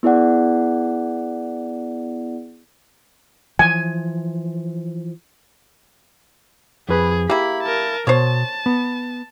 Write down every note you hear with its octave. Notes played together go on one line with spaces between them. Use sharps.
B3 E4 G#4 D5 F#5
E3 F3 G#5
F2 G#4 B4 B5
A#3 E4 G4 B5
A#4 A5
B2 C5 C#5 A5
B3